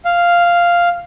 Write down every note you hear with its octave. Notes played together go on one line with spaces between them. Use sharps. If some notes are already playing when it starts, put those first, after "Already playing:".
F5